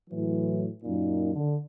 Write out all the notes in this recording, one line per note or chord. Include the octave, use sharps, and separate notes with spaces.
A2 E3 F#3
F#2 A#2 D#4
D3